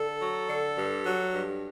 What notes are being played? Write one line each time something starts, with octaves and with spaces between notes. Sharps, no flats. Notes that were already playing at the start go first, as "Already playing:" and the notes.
Already playing: D3 A4
F#3
D3
G2
F#3
G2